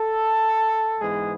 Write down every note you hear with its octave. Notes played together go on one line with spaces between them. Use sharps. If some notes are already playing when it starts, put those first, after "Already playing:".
Already playing: A4
G#2 E3 G#3 B3 G#4